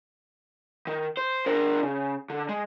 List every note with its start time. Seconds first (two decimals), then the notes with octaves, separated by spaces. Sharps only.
0.87 D#3
1.17 C5
1.46 D4 A#4
1.83 C#3
2.30 D3
2.49 G#3